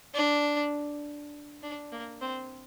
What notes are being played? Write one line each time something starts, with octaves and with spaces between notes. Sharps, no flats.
D4
D4
A#3
C4